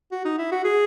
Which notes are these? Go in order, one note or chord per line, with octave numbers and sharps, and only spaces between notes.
F#4
D#4
E4
F#4
G#4